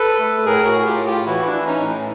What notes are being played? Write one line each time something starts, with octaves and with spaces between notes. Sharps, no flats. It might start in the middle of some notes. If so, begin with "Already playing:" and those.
Already playing: A4 B4
A3
A2 G#4 A#4
F#4 G#4
A2
F4 G4
A2
F4 G4
E3 E4 F#4
D4 E4
E3
C#4 D#4
A2